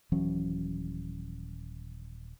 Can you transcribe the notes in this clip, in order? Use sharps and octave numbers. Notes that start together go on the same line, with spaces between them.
D#1 E3 F#3 C#4